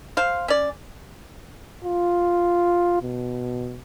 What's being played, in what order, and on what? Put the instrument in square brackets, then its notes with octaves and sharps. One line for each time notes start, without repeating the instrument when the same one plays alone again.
[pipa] C5 F5
C#4 D5
[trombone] F4
B2